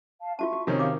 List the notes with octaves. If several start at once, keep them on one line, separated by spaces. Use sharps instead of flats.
F5 A5
F4 F#4 E5 A5 C#6
F#4
C3 D#3 C#4
A#4 F5 D6